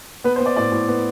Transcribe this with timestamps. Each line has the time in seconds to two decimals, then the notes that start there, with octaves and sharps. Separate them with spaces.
0.24 B3 B4
0.36 C5
0.40 B3
0.46 D5
0.56 A2 D5
0.72 A2
0.88 B3